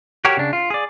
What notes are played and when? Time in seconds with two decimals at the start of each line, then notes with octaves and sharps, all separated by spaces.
0.25 F#4 G4 A#4 C#5
0.37 C#3 D4
0.53 F4
0.70 G#4 D5